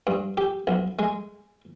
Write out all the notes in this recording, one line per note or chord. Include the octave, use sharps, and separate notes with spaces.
G2
G4
B1
G#3